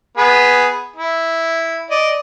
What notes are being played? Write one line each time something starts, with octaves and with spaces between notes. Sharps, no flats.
B3 G#4 B5
E4
D5 D#5